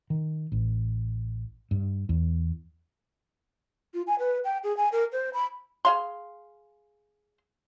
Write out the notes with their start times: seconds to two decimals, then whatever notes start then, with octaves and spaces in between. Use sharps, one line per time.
0.10 D#3
0.52 A1
1.71 G2
2.09 E2
3.94 F4
4.07 G#5
4.19 B4
4.44 G5
4.63 G#4
4.77 G#5
4.92 A#4
5.12 C5
5.33 B5
5.85 G#4 F5 C6